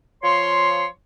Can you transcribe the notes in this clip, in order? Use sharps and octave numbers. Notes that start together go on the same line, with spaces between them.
F3 C#5 C6